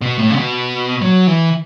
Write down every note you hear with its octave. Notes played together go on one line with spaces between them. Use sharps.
B2
A2
C#3
B2
F#3
E3